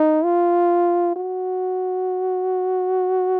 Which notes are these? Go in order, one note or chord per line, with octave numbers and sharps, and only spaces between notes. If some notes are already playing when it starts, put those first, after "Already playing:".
Already playing: D#4
F4
F#4